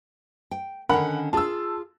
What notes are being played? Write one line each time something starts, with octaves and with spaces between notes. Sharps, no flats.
G5
D3 D#3 C#4 A#4 F#5 B5
F4 G#4 A5 E6